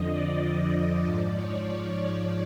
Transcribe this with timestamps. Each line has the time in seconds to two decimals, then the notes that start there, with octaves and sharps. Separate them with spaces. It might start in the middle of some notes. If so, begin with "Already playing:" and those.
Already playing: F2 D3 F3 D#5
0.10 D5
0.41 D5
0.72 D5
1.03 G#2 F3
1.35 C#5
1.66 C#5
1.97 C#5